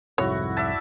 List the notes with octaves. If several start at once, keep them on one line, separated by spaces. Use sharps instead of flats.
C2 F2 G#2 E4 F#4 C#5
D5 E5 A5